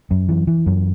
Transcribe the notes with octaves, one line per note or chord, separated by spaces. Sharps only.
F#2
E3
E3
F#2